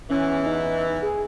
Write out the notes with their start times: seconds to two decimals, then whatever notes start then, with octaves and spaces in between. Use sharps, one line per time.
0.10 E2 E3 C#4
0.46 D#4
1.02 G#4